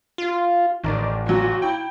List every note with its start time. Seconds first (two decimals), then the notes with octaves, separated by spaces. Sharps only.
0.18 F4
0.84 A1 D#3 A#4 D5
1.26 A#2 F#3 F#4
1.62 E4 G5